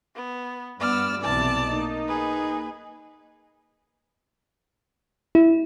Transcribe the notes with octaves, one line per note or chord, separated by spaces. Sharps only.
B3
G2 B3 D5 E6 F6
B1 C3 E3 D5 A5
A#3 D#4
G#4 B4
E4